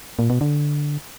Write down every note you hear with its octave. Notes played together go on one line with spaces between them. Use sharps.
A#2
B2
D3